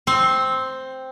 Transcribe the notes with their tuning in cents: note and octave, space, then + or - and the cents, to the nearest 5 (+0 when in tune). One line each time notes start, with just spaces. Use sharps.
C4 +0 C6 +35